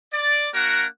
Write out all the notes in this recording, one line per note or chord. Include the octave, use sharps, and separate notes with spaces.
D5
A#3 D4 F#4 A#4 F#5